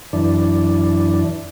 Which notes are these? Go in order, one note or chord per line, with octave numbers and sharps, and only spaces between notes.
F#2 E3 D4